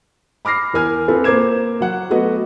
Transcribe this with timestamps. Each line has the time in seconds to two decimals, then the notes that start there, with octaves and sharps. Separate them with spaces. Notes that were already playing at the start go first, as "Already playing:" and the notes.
0.45 B5 D6 F6 A#6 C7
0.73 E2 A#4 G#5 F6
1.08 C4 F4 A4 B4
1.24 A#3 C5 D6 G#6 E7
1.80 F#3 F#5
2.10 A3 B3 F#4 B4 D#5